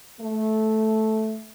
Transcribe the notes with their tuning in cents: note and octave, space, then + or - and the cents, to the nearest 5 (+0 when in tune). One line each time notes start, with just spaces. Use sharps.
A3 -10